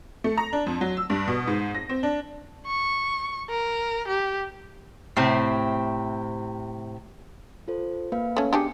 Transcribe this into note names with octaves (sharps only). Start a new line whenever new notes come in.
A3
A#5
D4
F2
F#3
E6
G2
B2
G#2
A#6
C4
D4
C#6
A#4
G4
A2 C3 C4
F4 A4 C5
A#3 B4 F5
A3 C#4
B3 D4 G4 G#4 C#7